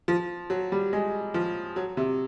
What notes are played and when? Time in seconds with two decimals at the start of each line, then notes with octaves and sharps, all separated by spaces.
0.08 F3
0.50 F#3
0.72 G3
0.93 G#3
1.34 F3
1.76 F#3
1.97 C3